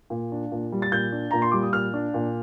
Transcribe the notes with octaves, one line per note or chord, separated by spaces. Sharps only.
A#2
D4
A#2
G3
A6
A#2 G6
D4
A#2 A#5
C6
G3 D6
D#6
A#2 F6
D4
A#2